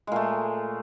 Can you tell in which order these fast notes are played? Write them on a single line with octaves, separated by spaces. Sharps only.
G#3 A#2 A3